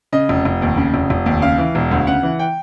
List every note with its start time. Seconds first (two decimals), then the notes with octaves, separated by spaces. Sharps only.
0.12 C#3 D#5
0.29 F1
0.45 F1
0.62 D#2
0.77 C#3
0.94 F1
1.10 F1
1.26 D#2
1.42 C#3 F5
1.58 E3
1.75 E1
1.91 D2
2.07 C#3 F#5
2.23 E3
2.39 G5